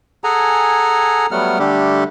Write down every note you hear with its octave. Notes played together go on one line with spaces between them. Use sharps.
G#4 A4 F#5 G#5 A#5
F#3 G3 A3 B3 F#5 F6
D3 G3 A3 D4 G4 A4